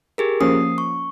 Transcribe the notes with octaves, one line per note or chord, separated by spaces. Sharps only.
G4 G#4 A#4
F3 A#3 C#4 D#6 C7
C#6